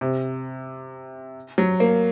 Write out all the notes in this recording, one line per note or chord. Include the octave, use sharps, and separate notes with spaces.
C3
F#3
A#3